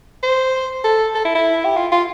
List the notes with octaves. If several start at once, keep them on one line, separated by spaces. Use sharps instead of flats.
C5
A4
A4
E4
E4
G4
F4
F4